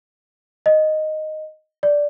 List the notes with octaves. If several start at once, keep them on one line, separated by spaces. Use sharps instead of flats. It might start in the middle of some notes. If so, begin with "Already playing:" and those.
D#5
D5